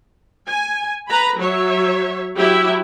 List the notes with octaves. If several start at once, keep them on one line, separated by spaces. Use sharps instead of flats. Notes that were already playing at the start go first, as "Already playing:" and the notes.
G#5
B4 A#5 B5
F#3 C#5 E5
F#3 E4 G4 E5